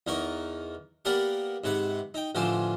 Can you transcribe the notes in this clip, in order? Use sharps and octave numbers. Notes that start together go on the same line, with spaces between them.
E2 D#4 A#4 C#6
A#3 B3 G4 A#4 D5 F#5
G#2 C3 B4 F#5
D#4 G5
A1 D3 F3 C5 G#5 D6